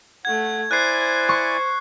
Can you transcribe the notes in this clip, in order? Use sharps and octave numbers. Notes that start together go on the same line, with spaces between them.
A3 F#5 G#6
E4 C5 D5 G#5 F#6 C7
C#6